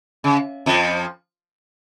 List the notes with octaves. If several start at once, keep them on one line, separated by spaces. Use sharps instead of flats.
C#3
F2 F3